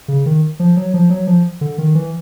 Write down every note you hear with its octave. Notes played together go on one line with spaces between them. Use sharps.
C#3
D#3
F3
F#3
F3
F#3
F3
D3
D#3
E3